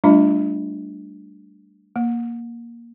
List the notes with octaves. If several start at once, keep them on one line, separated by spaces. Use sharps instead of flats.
G3 A3 D4 F4 D#5 B5
A#3